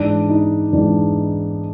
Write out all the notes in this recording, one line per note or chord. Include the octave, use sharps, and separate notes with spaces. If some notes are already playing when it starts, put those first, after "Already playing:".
Already playing: G#2 E3 D4
D#4
G#2 E3 D4